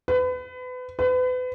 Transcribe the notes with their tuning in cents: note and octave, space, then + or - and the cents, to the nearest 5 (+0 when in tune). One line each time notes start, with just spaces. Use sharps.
B4 +30
B4 +35